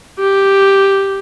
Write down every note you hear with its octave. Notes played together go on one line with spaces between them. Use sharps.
G4